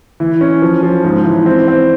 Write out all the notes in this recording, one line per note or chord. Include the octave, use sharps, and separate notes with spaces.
E3
C#4
F3
F3
G#2
E3
C4
C4